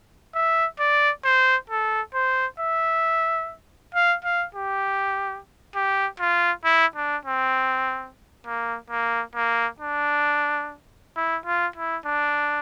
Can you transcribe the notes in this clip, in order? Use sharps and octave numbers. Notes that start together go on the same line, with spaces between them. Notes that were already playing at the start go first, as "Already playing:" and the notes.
E5
D5
C5
A4
C5
E5
F5
F5
G4
G4
F4
E4
D4
C4
A#3
A#3
A#3
D4
E4
F4
E4
D4